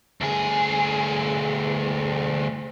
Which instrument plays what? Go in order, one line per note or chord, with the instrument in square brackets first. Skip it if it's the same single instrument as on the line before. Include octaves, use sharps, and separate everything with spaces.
[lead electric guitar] D2 G#4